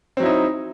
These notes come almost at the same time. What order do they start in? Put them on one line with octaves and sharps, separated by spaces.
C4 F#3 E4 D#4